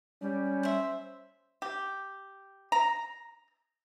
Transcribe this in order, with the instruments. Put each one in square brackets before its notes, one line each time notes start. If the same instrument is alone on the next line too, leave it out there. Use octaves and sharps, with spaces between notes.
[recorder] G3 [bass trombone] C#4
[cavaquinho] C5 E5
[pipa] G4
A#5